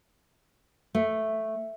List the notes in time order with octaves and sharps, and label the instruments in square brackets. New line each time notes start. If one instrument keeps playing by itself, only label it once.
[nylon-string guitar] A3